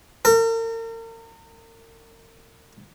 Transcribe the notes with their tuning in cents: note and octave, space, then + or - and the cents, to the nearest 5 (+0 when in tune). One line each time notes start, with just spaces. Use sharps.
A#4 -40